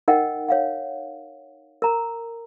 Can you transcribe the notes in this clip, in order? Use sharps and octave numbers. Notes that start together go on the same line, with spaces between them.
D#4 A#4 D#5 F#5 G5
C#5 F5 F#5
A#4 A#5